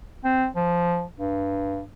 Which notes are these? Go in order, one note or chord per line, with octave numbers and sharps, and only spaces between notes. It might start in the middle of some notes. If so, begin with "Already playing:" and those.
C4
F3
G2